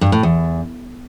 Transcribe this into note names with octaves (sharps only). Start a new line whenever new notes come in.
G2
A2
E2